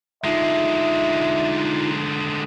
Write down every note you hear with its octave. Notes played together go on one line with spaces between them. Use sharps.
D3 G#3 D#4 F4 E5